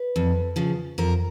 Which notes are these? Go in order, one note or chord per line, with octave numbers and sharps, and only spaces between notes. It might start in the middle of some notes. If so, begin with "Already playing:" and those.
Already playing: B4
F2
C#3 F3
F2 A#4